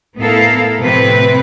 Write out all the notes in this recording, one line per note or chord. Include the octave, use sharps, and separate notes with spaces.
A2 B3 E4 A4 A#4 F5
A2 C3 F3 C4 B4